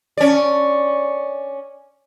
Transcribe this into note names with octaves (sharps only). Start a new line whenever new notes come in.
C#4 D5